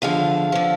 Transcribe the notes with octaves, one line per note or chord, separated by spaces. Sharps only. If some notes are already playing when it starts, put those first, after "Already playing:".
E2 D3 F3 F5
D3 F3